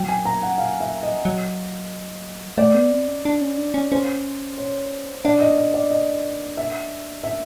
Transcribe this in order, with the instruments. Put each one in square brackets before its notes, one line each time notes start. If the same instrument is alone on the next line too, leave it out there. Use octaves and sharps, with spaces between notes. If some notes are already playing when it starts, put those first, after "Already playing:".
Already playing: [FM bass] F#3 [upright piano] G5
[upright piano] G#5
A#5
F#5
F5
E5
D#5
[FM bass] F#3
[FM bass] A3 [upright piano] D5
[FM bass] B3
C4
C#4
D4
C#4
D4
C#4
[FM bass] C#4 [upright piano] C5
[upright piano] C#5
[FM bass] D4 [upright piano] D5
[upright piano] D#5
D#5
D5
D#5
E5
E5